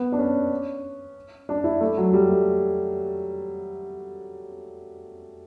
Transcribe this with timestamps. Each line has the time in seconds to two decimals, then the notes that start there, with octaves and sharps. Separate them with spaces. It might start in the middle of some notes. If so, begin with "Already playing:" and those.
Already playing: B3
0.12 D4
0.19 C#4
1.49 D4
1.64 E4
1.81 A3
1.97 F#3
2.13 G3
2.29 A3